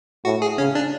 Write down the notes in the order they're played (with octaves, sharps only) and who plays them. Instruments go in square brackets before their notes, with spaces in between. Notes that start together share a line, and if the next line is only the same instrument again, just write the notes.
[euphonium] A2 [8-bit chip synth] F#4
[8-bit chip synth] G#4
[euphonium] C#3 [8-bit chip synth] C#4
[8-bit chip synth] D4